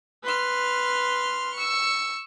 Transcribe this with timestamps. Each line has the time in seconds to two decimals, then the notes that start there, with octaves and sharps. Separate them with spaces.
0.24 B4 C6 F6
1.55 C#6 E6